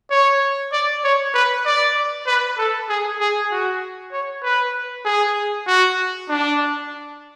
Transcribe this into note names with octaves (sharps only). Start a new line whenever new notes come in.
C#5
D5
C#5
B4
D5
B4
A4
G#4
G#4
F#4
C#5
B4
G#4
F#4
D4